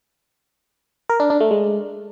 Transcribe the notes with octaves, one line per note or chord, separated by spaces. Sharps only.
A#4
D4
D4
A3
G#3